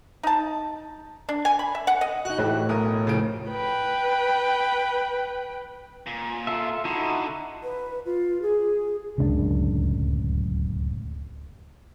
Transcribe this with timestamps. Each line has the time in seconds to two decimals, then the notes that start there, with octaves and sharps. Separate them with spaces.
0.23 D#4 A5
1.29 D4
1.45 G#5
1.59 B5
1.75 E5
1.87 F#5
2.01 D#5
2.25 D#4 F#4 F#6
2.38 A2 E3 F#4 G4
2.69 B1 A#4 D#6
3.07 C#3 F3 D7
3.51 B4 G5
6.07 A#2
6.47 F4 A4 E5
6.85 D3 D#4 E4 F#4
7.63 B4
8.05 F4
8.41 G#4
9.18 D1 C#2 F#2 D4